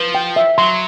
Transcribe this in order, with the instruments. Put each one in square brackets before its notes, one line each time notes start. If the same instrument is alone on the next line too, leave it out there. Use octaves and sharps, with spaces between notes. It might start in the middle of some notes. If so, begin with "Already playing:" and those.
Already playing: [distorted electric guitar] F3 [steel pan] B4
[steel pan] G5
E5
[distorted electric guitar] F#3 [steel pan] C6